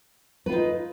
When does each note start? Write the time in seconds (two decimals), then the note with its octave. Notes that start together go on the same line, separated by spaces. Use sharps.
0.46 B4
0.49 F4
0.52 D#4